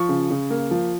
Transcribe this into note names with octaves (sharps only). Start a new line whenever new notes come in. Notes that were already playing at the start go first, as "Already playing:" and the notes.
Already playing: F3 C#6
C#3
C#3
A#3
F3